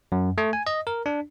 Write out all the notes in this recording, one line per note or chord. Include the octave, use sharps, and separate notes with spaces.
F#2
A3
G#5
D#5
A#4
D4